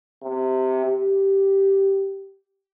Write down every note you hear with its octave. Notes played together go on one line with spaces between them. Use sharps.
C3
G4